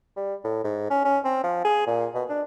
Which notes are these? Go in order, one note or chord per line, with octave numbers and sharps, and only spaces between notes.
G3
A2
G#2
C#4
C#4
C4
F3
G#4
A#2
B2
D4